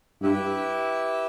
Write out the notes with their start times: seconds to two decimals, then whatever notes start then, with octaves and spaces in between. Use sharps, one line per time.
0.22 G2 E4 G4 B4 E5